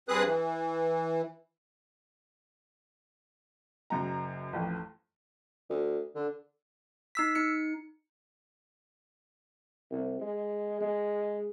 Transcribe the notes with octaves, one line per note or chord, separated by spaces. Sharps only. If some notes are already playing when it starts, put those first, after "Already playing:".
G2 C4 G#4 B4 D#6 F#6
E3
F#1 F#2 A#5
A1 F2
D2
D3
D#4 E6 B6
D#4 C#7
C2
G#3
G#3